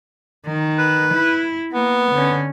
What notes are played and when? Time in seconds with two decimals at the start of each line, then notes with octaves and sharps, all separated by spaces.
0.47 D#3
0.79 B4
1.14 E4
1.73 A#3 B3
2.12 D3 C#4